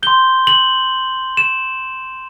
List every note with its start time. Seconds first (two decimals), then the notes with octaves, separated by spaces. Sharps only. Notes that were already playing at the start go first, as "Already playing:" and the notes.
0.03 C6 G6 G7
0.47 F#7
1.37 E7